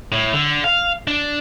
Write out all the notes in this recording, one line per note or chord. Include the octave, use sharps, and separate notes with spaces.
A2
D3
F5
D4